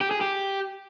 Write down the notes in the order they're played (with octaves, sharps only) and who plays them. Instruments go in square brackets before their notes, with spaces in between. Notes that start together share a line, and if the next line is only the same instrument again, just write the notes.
[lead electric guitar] G4
G#4
G4